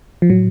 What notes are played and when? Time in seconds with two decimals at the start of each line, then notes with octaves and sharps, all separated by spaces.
0.22 F3
0.29 A2 F#3